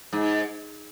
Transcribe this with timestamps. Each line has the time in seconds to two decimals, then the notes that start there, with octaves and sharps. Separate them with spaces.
0.13 G#2